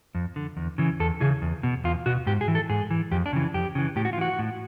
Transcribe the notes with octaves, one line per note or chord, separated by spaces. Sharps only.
F2
D3
E2
C#3 E3
E2 A4
C#3 E3 G#4
E2
B2
E2 F4
B2 F#4
G#2 G4
G#4
E3
A4
G#2 G#4
E3
F2 G4
D4
C#3 E3
F2 G4
C#3 E3
A2 G4
F#4
F4
E3 F#4
A2